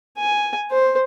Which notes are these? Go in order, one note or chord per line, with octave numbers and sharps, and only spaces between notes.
G#5
C5